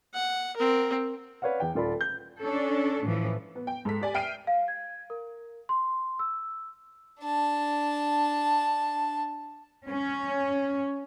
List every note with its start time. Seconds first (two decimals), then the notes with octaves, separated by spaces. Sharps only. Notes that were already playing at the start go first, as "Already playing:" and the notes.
0.14 F#5
0.57 C4 A#4
1.42 B4 C#5 D5 F5 F#5
1.60 E2 G5
1.75 D#1 F4 A4 D5 B5
2.01 G6
2.42 C#4 D4 A4
3.04 A2 E3 F3
3.55 B3
3.67 G5
3.85 G#2 A4 B6
4.01 G4 D5 G#5
4.14 E5 G5 F6 C7 D7 D#7
4.47 F5
4.68 G#6
5.10 A#4
5.69 C6
6.19 E6
7.21 D4 A5
9.88 C#4